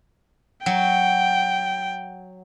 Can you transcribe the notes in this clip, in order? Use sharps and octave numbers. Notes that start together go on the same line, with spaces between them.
F#3 G5